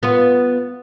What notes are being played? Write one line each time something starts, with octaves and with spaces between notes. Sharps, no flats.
B3 F4 B4